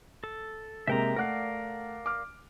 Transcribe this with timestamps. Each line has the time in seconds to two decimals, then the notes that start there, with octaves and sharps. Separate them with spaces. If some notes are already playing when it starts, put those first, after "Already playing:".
0.24 A4
0.87 C3 G#3 A#3 E5 G5 A#5
1.16 A3 A#4 D5 F5 F#5 F#6
2.06 D6 F6